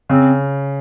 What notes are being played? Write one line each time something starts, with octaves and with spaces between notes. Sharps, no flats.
C#3 C4